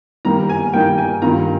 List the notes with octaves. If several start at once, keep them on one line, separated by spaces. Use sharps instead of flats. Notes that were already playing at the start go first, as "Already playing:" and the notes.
D#3 G3 A#3 A#5
G#5
D#3 G3 A#3 G5
G#5
G2 D#3 G3 A#3 F4 A#5